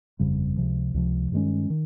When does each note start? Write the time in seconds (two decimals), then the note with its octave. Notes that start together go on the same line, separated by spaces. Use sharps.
0.19 G1 F2 C#3 G3
0.57 C#2 C3 F3
0.94 C#2 C3 F3
1.32 G2 D#3 G#3 C#4
1.70 D#3